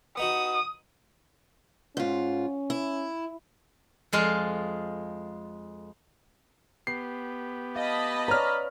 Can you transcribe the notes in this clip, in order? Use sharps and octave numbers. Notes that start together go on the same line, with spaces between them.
B3 D#4 F#4 D#6
G#2 C#4 F4
E4
F2 G#3 F4 F5
B3 G4 C7
D#5 F5 A5 B5
B4 C#5 D5 A#5 F6